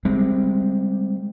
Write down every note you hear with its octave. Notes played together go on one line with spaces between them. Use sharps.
G3 G#3 C4